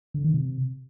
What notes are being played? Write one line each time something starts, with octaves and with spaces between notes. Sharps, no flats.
D3
D#3
C3